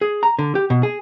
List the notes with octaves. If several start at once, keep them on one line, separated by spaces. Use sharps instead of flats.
G#4
A#5
D3
G4
B2
G#4